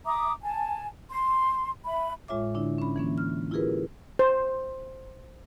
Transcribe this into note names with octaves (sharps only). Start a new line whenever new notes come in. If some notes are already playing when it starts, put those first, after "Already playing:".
E5 A#5 D6 D#6
G#5 A5
C6
E5 B5
A2 G#3 F4 C#5 E5 D6
D3 D4 E4
C#4 B5
E3 A#3 C#4
F6
E4 F4 G4 G#4 A#4 B4
C5